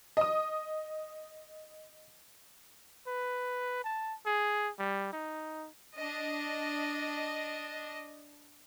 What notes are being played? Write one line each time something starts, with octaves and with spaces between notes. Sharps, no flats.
D#5 D#6
B4
A5
G#4
G3
D#4
D4 D#5